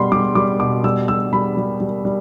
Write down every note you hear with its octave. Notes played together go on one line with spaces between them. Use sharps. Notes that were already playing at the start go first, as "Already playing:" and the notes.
Already playing: B2 G3 B5 C6
G3 D6
G3 D6
B2 D6
G3 E6
G3 E6
G3 B5
G3
G3
G3